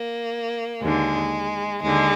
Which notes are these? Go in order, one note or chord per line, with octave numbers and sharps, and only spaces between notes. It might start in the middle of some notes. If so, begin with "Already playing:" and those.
Already playing: A#3
D#2 D3 G#3
D#2 D3 G#3